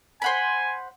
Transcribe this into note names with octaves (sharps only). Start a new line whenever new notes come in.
C5 F#5 G#5 B5